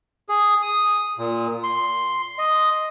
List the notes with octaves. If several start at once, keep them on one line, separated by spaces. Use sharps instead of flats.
G#4
D#6
A#2
C6
D#5